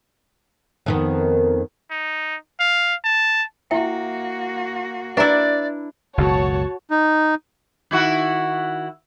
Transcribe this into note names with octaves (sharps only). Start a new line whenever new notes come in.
F2 D#3 B3
D#4
F5
A5
A#3 E4 F#4 E5 G5
D4 E4 B4 D5 E5 A#5
F#1 C#2 B2 F#4 C#5 A5
D#4
D#3 E4 F#4